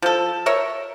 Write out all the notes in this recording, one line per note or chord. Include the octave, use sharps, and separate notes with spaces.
F3 A4
A#4 C#5 E5